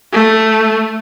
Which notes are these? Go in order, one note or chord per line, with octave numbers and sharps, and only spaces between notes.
A3